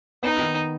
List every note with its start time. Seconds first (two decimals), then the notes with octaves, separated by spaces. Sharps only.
0.23 B3 D#4
0.39 D#3